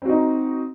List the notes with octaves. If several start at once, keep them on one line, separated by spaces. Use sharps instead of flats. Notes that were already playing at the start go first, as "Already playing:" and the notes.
C4 D#4 F#4